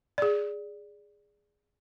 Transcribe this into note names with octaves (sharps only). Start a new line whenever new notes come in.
G#4 D5